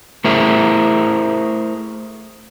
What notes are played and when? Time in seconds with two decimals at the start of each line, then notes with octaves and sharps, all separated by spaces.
0.24 A3 E4 G#4 A#4 C5 E5